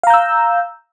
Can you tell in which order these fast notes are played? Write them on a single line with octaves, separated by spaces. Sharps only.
F5 A#5 G6 E6